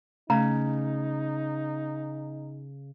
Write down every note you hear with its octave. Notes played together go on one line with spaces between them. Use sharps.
C#3 A3 D#4 A#5